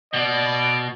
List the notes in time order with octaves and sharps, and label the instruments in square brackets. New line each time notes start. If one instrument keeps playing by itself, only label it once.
[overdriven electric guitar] B2 [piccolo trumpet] D5